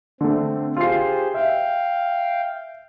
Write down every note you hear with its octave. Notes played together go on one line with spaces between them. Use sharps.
D3 A3 C4
F4 G4 G#4 C5 C7
E5 F5 G5